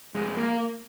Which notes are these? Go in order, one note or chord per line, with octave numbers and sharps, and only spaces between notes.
F1 G#3
A#3